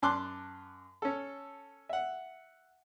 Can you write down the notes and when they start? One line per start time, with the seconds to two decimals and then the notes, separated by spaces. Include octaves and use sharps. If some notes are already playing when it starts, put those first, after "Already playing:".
0.02 F#2 A5 C6 D6 F#6
1.02 C#4 A4
1.89 E5 F#5